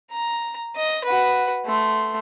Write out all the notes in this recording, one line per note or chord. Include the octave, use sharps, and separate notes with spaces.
A#5
D#5
F#4 B4
A3 C6